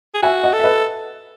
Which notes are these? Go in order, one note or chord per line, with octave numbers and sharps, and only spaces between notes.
G#4
F#4 E5 G#5
D#5 F#5
A4
E5
B4 D#5